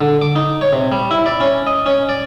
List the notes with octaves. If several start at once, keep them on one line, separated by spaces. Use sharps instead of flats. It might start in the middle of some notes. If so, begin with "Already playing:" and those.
D3
D6
D#4
C#5
C3
G3
E4
D5
C#4
D#5
C#4
D5